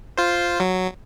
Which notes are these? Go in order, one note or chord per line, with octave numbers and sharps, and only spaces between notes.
F4 C5
F#3